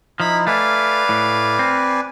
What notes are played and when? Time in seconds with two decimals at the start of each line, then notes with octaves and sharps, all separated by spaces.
0.20 F3 D#4 E4 B5
0.47 A3 B4 D5 F5 G#5
1.09 A2
1.59 C4